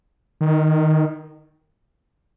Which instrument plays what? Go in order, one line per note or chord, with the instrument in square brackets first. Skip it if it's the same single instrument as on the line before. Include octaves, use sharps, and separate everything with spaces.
[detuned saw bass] D#3